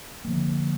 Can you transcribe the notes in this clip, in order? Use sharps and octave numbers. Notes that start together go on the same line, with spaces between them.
D3 F3 A#3